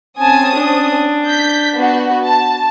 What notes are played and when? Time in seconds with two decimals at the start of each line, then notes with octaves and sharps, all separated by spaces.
0.18 C4 C#4 G#5 A5 D#6
0.57 D4
1.27 G6 B6
1.76 B3 F#4
2.25 A5